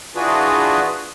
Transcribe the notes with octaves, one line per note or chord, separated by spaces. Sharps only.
E3 D4 F4 F#4 G#4 B4